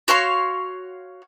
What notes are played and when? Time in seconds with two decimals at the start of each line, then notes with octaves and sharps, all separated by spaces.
0.08 F#4 C#5 F5 C6